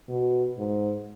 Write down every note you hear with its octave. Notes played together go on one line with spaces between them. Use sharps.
B2
G#2